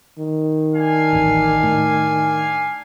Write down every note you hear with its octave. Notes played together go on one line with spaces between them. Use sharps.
D#3
D4 F5 G#5
D1 A1
A2